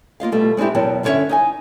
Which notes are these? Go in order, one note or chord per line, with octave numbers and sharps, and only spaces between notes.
A#3 F4 D#5 F5
B2 G3 A3 F4
G#3 C4 D4 E4 G4
E2 B2 F#3 A#4 G5 A5
G2 D3 C#4 F4 C#5 E5
D#4 E5 G#5